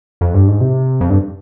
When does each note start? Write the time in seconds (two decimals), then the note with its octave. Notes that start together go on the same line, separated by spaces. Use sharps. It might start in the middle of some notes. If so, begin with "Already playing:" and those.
0.21 F2
0.34 G2
0.48 G#2
0.61 C3
1.01 F2
1.10 G2